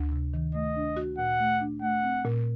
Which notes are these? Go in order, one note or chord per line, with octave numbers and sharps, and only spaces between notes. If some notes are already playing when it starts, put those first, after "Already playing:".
Already playing: D2
C3
D#3
A3 D#5
D4
F#4
A#2 F#5
A3
D4
A3 F#5
C4
A#2